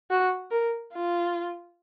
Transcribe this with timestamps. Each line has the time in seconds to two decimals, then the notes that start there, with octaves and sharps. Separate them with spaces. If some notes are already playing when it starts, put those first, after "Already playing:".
0.10 F#4
0.51 A#4
0.93 F4